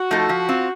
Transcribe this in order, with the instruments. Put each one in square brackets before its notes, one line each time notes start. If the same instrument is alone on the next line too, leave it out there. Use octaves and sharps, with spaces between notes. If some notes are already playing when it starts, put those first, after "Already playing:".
Already playing: [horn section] F#4
[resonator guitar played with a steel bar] F3 A3 D#4 A4
F3
C4 F4